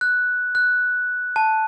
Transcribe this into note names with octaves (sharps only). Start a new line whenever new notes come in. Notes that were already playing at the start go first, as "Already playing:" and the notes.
F#6
F#6
A5